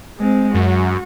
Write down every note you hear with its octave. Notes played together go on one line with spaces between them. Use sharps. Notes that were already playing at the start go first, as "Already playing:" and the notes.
G#3 C4
F#2 F#4